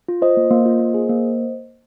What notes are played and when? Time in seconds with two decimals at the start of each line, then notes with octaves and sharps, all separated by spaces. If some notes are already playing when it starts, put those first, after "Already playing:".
0.08 F4
0.22 F4 C5 D#5
0.37 A#3
0.51 A#3
0.66 F4
0.80 A#3
0.94 G#4
1.09 A#3